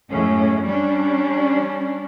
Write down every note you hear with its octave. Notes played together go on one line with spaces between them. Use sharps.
F#2 A2 G#3 C#4
G3 C#4 D4